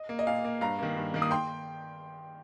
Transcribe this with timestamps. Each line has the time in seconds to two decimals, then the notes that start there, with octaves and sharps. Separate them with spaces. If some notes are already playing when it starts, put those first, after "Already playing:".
Already playing: D#5
0.09 A#3
0.19 D#5
0.27 A#2 F5
0.45 A#3
0.61 G2 F5 A#5
0.79 D#3 A#3
0.96 G2
1.14 D#3 A#3
1.22 D#6
1.31 G5 C6